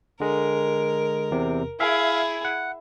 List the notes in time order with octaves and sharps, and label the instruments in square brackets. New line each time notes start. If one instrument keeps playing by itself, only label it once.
[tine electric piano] D3 G#3 [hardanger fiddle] A#4
[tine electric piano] E2 C3
[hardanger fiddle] E4 G#4 [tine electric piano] E5 F5
[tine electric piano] F#5